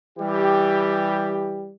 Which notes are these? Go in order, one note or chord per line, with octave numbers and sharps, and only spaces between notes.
E3 G3 G4